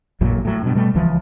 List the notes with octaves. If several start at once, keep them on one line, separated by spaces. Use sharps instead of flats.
A1 F#2 A#2 F#3
A2 F#3
G2 B2
B2 G3 A3
D1 C#2 E3 F3